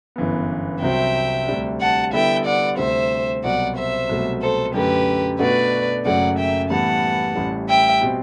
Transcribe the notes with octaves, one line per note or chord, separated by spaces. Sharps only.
G1 F#2 E3 B3
C2 C3 F#3 C4 F#4 E5 G5
D2 C3 G3 D4
F#5 A5
D3 G3 B3 E4 A4 E5 G5
D5 F#5
D2 C3 G3 C5 E5
C2 B2 F#3 D5 F#5
C5 E5
C2 B2 F#3 A3
A4 C5
F#2 D3 A3 G4 B4
B2 A3 D4 F#4 B4 D5
F#1 F#2 F#3 A3 D5 F#5
E5 G5
A2 E3 G3 B3 F#5 A5
A1 A2 E3 G3
E5 G5
B2 G3 C4